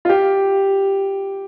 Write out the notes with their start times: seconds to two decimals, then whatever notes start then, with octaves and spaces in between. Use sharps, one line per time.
0.05 F4
0.09 G4